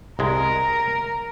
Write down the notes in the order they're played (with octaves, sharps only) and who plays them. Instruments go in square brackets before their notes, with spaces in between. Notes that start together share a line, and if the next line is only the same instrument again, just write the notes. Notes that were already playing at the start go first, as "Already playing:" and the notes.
[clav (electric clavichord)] C2 G#3 [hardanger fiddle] A#4